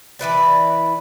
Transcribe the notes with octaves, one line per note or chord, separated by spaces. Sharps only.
E3 E4 B4 D5